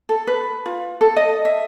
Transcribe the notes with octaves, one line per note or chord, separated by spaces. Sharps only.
A4
B4
F4
A4
D#5
E5